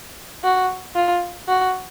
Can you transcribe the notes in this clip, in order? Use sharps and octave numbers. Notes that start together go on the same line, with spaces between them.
F#4
F4
F#4